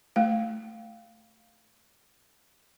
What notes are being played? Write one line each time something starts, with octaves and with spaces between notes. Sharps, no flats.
A3 F5